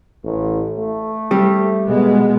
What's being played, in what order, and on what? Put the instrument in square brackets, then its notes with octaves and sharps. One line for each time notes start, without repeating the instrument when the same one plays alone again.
[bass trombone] A1
A3
[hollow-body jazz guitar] G3 C4 G4
[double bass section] B2 G#3 B3